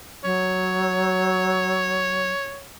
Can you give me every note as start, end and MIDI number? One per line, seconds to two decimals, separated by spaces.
0.24 2.33 54
0.24 2.65 73